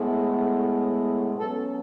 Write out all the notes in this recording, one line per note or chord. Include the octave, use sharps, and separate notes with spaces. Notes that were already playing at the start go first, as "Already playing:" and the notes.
Already playing: A2 G#3 B3
B2 F#3 C#4 A4